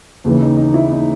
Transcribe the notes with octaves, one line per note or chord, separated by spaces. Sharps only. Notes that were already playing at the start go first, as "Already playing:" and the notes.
D#2 C#3 E3
D#4
D#4
E4
D#4